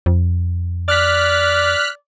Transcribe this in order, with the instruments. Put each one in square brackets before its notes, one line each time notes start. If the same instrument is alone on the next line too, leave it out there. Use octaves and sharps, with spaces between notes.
[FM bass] F2
[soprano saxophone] D5 [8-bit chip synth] F6 F#6 B6